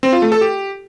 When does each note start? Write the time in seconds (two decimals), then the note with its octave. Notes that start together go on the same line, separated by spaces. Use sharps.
0.03 C4
0.13 F4
0.22 A3
0.32 A4
0.41 G4